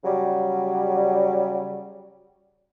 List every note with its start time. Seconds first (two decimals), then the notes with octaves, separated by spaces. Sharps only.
0.04 C#3 F#3 G3